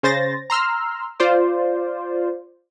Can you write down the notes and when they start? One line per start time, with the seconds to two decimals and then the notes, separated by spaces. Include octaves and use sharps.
0.03 C#3 C5 A6 A#6
0.50 A#5 C6 E6 F6
1.20 F4 C5 D5